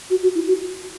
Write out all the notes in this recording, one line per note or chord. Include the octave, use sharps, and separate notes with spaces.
F#4
F#4
E4
F#4